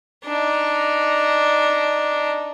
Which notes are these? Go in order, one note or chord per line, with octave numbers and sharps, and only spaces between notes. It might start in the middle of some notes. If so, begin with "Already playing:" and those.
D4 D#4